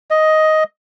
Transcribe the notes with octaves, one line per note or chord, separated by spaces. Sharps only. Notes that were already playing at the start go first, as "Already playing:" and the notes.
D#5